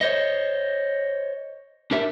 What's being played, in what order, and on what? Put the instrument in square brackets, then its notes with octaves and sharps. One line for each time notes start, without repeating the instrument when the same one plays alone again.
[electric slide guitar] C5 C#5 D#5
D4 G4 A#4 E5